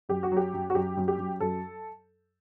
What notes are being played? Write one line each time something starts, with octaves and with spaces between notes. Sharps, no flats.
F#2 G4
F#4
F#3 G4
F#2
F#4
F#2 G4
F#2
G4
F#2
F#2 A4